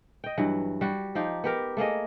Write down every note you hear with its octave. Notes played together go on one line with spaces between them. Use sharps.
D#5 G5
G2 E3 F#3
G3 F#4
F3 D#4 G4
B3 G4 A#4
A3 A#3 G#4 D#5